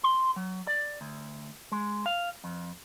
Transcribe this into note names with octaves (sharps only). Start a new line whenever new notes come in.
C6
F#3
D5
D2
G#3
F5
F2